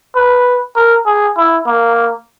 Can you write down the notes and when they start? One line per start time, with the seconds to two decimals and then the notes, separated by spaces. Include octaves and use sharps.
0.16 B4
0.76 A#4
1.06 G#4
1.37 E4
1.67 A#3